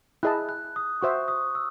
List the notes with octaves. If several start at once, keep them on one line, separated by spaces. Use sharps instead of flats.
E4 G#4 D#5 A5 F#6
F#6
D#6
F#4 C5 E5 C#6
D#6
E6